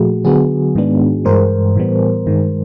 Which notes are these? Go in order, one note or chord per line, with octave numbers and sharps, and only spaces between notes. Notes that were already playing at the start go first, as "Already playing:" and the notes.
Already playing: A#2 F3 A3 F#4 G#4
D3 F#3 B3 F#4 G#4
G#2 D#3 G#3 B3 D4
G2 E3 G#3 A#4 C5
A2 E3 G3 B3
G2 D#3 G#3